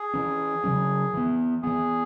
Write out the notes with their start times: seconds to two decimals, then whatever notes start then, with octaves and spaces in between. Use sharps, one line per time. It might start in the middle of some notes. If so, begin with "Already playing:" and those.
Already playing: G#4
0.14 E3 C#4
0.64 C#3 F#3 C#4
1.14 E3 B3
1.63 E3 B3 G#4